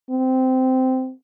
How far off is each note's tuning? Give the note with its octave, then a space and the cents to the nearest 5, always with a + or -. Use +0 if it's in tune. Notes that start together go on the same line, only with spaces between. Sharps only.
C4 -15